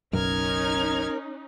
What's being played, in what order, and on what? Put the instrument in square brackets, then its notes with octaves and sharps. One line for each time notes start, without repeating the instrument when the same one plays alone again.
[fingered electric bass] F#1 B1 F#2 [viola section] C#4 D#4 [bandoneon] A#4 [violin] F6 G#6